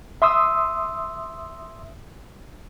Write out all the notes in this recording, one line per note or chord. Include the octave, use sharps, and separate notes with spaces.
E5 C6 D#6 E6